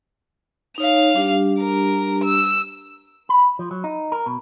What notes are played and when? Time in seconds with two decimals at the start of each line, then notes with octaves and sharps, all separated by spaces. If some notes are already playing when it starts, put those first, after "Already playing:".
0.78 D#4 C#5 F5 F7
1.14 G3 D4 G4
1.61 A#4
2.24 E6
3.29 B5
3.59 F3
3.71 F#3
3.84 D#4
4.12 A#4
4.26 B2